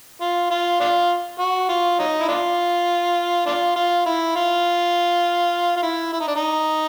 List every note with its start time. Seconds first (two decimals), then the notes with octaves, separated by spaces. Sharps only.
0.21 F4
0.50 F4
0.80 D4 F4
1.39 F#4
1.69 F4
1.99 F#3 D#4
2.20 E4
2.28 D4 F4
3.46 D4 F4
3.76 F4
4.06 E4
4.35 F4
5.76 F4
5.83 E4
6.13 E4
6.20 D#4
6.28 D4
6.35 D#4